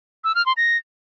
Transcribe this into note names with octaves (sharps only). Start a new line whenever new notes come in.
E6
F6
C6
A#6